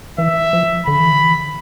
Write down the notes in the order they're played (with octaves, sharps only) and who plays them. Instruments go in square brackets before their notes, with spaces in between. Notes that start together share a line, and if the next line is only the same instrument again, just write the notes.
[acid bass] E3 [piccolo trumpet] E5
[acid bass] F3
[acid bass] D3 [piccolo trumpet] B5
[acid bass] E3
D3
E3
D3